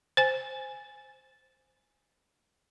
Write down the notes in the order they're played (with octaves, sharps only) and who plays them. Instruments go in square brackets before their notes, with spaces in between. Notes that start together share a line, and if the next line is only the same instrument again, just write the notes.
[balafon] C5 G#5